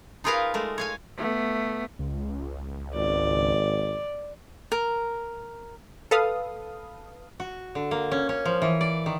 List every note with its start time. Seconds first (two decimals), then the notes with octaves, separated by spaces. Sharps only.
0.24 D#4 F4 G#4 A#4 B4 F5
0.54 G#3 A3 A#4
0.78 C#5 F5 G#5
1.17 A3 B3
1.99 C#2
2.95 G#1 D5
4.72 A#4
6.11 A4 B4 F5 D#6
7.40 F#4
7.75 D3
7.91 A#3
8.11 C#4
8.29 C#4
8.45 F3
8.62 E3
8.81 D5
9.06 D#3